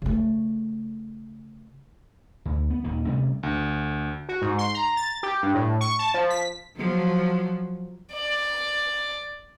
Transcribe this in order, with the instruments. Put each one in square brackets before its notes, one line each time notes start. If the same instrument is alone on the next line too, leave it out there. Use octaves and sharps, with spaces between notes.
[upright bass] C#3 A3
[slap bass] D2
B3
D#1 D#2 D#3
C3 G3 A3 C#4
[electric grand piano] D2
[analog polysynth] F#4
G#2
C6
A#5
A6
G4
G2
A2
C#6
A5
F3
B6
[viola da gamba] F3 F#3
[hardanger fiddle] D5